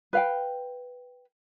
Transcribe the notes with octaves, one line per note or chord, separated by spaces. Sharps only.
B4 F5 G5